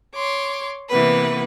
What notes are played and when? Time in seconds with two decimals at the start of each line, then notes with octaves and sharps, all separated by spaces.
0.14 C#5 C6 D6
0.89 C3 E3 A#3 B3 B4